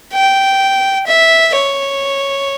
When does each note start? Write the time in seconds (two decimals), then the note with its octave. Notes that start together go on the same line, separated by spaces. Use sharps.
0.13 G5
1.07 E5
1.54 C#5